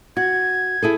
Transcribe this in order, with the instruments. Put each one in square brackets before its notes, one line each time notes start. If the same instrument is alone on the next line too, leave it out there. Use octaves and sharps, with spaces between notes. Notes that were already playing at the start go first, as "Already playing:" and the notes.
[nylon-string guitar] F#4 [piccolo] G#6
[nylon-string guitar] E4 G#4 A4